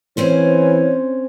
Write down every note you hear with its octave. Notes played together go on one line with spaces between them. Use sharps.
E3 C4 C#4 C5 C#5